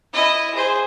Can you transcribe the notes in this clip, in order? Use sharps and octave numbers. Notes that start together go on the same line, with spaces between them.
E4 D#5
G#4 C5